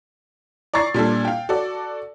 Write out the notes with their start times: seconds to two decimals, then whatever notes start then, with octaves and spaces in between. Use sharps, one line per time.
0.74 D5 A#5 C#6 A6 C7
0.94 A#2 G3 D4 A4
1.25 F5 G5
1.49 F#4 A4 D5